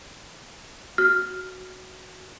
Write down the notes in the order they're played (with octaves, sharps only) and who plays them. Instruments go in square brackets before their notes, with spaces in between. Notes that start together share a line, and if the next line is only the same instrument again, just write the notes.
[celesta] F#4 [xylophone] F6